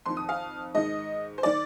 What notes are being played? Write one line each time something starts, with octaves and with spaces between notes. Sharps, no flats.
F2 D#3 C6
D#6
F5
G#2 D#3 D#5
C5
D#3 D5